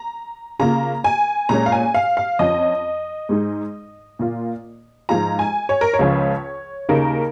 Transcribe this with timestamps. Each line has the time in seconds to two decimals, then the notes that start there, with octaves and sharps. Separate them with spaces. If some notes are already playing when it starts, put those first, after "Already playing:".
Already playing: A#5
0.59 C#3 A#3 F4 A#5
1.04 G#5
1.49 A#2 G#3 C#4 A#5
1.66 F5
1.72 G#5
1.94 F5
2.17 F5
2.39 F2 F3 C#4 D#5
3.29 G#2 G#3 D#4
4.19 A#2 A#3 F4
5.09 G#2 F3 G#3 F4 A#5
5.39 G#5
5.69 C#5
5.81 A#4
5.94 C#5
5.99 C#2 C#3 F3 C#4 F4
6.89 D#2 C#3 A#3 D#4 A#4